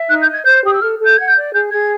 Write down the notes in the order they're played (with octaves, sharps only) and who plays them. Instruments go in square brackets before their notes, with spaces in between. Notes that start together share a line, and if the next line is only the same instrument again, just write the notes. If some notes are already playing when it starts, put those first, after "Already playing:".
Already playing: [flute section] E5
[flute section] D#4 [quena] F#6
[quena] G6
[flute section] D#5
[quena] G#6
[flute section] C5 [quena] G6
[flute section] G4 [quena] D#6
[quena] E6
[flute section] A4 [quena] F6
[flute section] A4
[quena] G6
[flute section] F#5 [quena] G#6
[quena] G6
[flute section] D5
[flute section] G#4 [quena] G6
[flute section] G#4 [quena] G#6